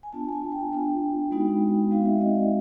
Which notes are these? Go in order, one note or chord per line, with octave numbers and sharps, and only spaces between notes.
G#5
B3 D4 F4 A5
A5
G#5
G5
B3 D4 F4
G#3 B3 D#4 F#4
G#3 C4 D#4 F#4 F5
E5
D#5
D5